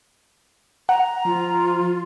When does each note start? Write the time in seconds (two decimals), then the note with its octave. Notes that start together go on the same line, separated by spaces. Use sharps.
0.89 F#5 A#5
1.25 F3 F4